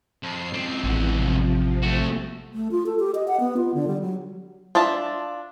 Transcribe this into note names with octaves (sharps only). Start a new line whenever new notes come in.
F2 C7
C#2 C4
A1 E2 F#5
C3 F3
A3 F#4
A3
F4
A4
G4
D#5
F#5
B3
F4
D3
G3
F#3
D4 F4 E5 A5